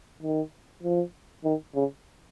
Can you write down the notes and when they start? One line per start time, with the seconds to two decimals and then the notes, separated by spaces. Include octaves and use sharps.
0.22 D#3
0.83 F3
1.45 D#3
1.75 C#3